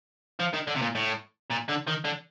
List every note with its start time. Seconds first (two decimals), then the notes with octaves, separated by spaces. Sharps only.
0.40 F3
0.54 D#3
0.68 D3
0.76 C3
0.82 A#2
0.95 A2
1.50 A#2
1.68 D3
1.87 D#3
2.04 D3